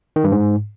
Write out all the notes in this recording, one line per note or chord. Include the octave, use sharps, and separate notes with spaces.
D#3
G2
G#2